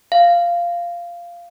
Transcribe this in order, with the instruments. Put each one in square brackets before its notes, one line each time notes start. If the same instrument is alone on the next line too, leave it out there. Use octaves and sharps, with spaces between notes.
[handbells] F5